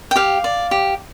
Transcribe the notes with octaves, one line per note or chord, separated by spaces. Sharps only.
G5
G4 F5
D5
G4